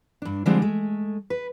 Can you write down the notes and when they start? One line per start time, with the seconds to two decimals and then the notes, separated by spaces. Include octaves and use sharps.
0.22 G2 D4
0.46 D3 F3 G3 G#3 C4 D4
0.62 G#3 A3
1.30 B4